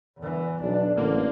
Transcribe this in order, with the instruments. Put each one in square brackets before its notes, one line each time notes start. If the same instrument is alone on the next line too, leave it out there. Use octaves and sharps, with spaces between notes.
[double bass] E2 E3
[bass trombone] B1 [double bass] D4
[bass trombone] A1 [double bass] D3 [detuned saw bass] A#3